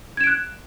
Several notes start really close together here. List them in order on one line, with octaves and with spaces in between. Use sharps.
G#6 E7 D7 F#6